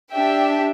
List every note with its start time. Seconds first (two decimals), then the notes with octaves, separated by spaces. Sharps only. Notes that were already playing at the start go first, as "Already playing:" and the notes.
0.12 D4 G4 E5 G5